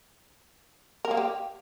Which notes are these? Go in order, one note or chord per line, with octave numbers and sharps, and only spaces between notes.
A#4
A#3
G4